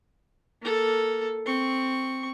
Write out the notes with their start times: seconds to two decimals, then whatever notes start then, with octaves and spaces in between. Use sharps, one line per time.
0.62 A#3 A4
1.46 C4 C#6